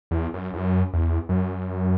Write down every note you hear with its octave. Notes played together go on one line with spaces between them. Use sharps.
E2
F#2
E2
F#2
E2
F#2